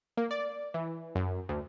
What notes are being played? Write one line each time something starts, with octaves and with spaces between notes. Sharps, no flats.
A#3
D5
E3
F#2
D2